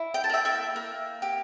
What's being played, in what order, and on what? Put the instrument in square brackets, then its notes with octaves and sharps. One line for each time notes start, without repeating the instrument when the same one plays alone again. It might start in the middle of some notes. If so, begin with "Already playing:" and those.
Already playing: [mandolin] E4
G5
A5
A#3 E5 G5
E5 G5
A#3
G4